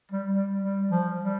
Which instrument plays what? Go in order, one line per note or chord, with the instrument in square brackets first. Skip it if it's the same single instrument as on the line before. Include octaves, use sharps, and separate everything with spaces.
[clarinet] G3
G3
G3
F3
G3